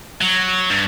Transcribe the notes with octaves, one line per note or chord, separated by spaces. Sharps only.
F#3
G2